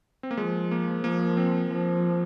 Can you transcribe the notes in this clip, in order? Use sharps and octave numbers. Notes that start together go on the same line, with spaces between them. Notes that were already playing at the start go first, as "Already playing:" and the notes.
C4
A#3
F3 G#3
A#3
F3 A#3
C4
F3